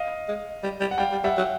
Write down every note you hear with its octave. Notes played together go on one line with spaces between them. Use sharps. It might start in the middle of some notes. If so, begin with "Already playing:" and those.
Already playing: D#5 F5
G#3
G3
G3
F#5
G3 F5 G5
G3
G3 E5 F#5
F#3